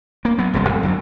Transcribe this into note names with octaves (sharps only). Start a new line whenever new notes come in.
A#3
F#3 B3
E1 C2 A#2 G#3
F2
F#2 D3 F#3